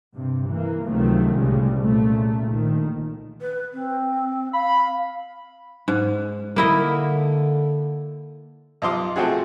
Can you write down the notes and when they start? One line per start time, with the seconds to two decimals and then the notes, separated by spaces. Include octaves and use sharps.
0.15 G2 C3
0.47 E3 A#3
0.85 C#2 C3 D#3 F3 F#3 A3
1.35 C2 A2 C#3 G3 G#3
1.81 A#2 C#3 A3
2.49 A#1 D#3
3.41 B4
3.73 C4
4.53 F5 B5
5.88 G#2
6.56 D3 A#3 E4 D#5
8.82 B1 F3 D#5 C6 D6
9.16 F3 A3 C4 D#4 F#4 G#4